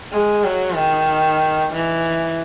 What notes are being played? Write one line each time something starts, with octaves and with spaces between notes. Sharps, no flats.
G#3
F#3
D#3
E3